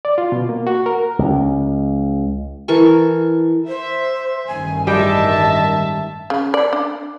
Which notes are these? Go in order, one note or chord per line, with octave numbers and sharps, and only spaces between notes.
D5
F4
B2
A#3
F#4
A#4
C#2
E3 A4 A#4 C#6
C5 E5
A1 G2 D#3 G#5
G3 G#3 D#5 E5 G5 A5
C#3
D5
D4